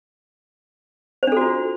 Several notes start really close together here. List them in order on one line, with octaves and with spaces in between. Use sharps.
C5 D4 A4 F#4 F4